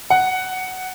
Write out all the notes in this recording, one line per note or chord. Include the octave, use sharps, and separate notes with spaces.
F#5